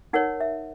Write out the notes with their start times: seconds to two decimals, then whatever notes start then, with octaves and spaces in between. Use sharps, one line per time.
0.13 D#4 A#4 C#5 F#5
0.41 E5